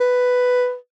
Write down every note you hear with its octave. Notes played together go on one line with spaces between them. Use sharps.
B4